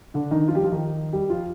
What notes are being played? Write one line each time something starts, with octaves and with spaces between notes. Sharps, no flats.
D3 D4
D#3 D#4
F3 F4
G3 G4
F3 F4
D#3 D#4
G3 G4
F3 F4